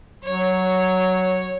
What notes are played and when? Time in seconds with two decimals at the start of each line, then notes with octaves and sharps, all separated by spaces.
0.24 F#3 C#5